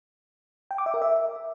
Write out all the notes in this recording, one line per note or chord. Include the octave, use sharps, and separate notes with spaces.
G5
D6
E5
A#4
E5